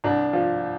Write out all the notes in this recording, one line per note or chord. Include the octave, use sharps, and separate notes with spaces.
C2 D4
F3